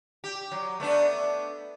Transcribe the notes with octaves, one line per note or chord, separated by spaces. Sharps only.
G4
F#3
A3 B3 D4